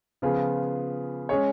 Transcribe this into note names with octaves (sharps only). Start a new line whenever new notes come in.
C#3 F3 B3 F4 G#4
G#3 C#4 G#4 C#5